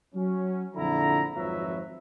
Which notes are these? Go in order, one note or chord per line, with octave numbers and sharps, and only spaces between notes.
F#3 C#4
A#1 F2 D3 E4 A#5
G#1 F2 F3 F#3 B4 E5